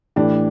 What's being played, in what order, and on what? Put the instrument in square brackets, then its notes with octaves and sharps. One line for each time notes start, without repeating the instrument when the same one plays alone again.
[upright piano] A2 E3 A3 D4 G4